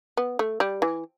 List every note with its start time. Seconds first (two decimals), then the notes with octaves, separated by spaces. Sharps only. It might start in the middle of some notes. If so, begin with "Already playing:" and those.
0.17 B3
0.39 A3
0.60 G3
0.82 E3